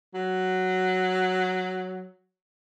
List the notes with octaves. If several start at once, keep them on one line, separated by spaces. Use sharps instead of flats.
F#3